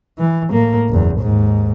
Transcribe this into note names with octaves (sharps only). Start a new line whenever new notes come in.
E3
A2 A#3
F#1 E2
D#2 G#2